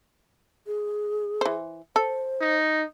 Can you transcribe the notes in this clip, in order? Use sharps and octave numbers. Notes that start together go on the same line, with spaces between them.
G#4
E3 C5
A4 C5
D#4